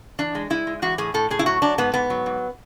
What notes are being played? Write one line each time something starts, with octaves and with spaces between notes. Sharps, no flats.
E3 D4
G#3
G#3 E4
G#3
E3 F#4
A2 G#4
A2 A4
A2 G#4
E4
F#3 F#4
F#3 D4
G#2 B3
G#2 B3
F#3
G#2